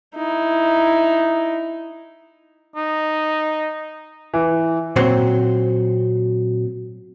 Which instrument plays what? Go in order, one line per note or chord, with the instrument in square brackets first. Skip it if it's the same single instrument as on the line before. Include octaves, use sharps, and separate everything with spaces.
[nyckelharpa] D#4 E4
[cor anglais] D#4
[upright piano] E3
[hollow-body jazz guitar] A#2 F#3 C4 C5